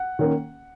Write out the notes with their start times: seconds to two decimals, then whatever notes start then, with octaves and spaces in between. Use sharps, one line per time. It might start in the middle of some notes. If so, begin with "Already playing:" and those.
Already playing: F#5
0.19 D#3 A#3 C#4